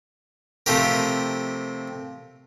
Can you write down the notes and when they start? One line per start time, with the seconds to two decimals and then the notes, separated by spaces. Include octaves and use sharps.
0.66 C3 F3 A3 G4 A#4